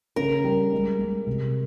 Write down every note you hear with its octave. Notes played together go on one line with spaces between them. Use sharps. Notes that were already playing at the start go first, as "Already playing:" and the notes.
C#3 A#4
G3
G#3
G#3
C3